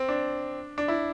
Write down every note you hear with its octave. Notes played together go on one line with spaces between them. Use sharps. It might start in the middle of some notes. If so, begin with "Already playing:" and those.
Already playing: C4
D4
D4
E4